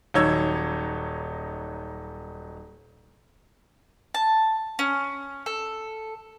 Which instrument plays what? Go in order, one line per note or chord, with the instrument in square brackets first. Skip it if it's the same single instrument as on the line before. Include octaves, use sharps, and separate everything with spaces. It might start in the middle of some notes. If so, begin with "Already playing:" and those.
[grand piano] D#1 F#3 D#4 C#5 E6 G#6
[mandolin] A5
C#4
A4